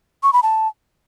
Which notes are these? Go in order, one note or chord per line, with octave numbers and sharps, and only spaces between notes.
C#6
B5
A5